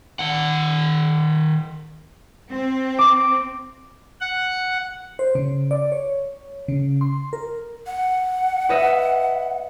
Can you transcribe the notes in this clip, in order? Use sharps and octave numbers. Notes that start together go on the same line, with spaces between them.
D#3 F#5
C4
D6
F#5
C5
C#3
D5
C#5
C#3
C6
A#4
F#5
B4 D#5 E5